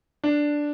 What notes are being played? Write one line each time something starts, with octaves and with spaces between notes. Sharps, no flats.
D4